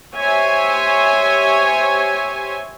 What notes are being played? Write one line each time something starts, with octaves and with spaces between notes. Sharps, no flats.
G4 C5 C#5 E5 G#5